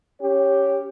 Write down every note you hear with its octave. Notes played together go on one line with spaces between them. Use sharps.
C#4 G4 C#5